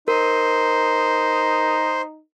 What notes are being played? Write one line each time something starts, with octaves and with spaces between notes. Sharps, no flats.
D#4 A#4 C5